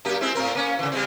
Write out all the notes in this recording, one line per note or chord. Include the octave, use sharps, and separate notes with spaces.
F#2 A#3 G4
G#3 C4 E4
A2 C4 A#4
A#3 C#4
C#3 E3
G3 G#3 C4